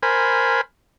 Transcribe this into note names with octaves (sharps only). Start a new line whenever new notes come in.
A#4 C5 G#5 B5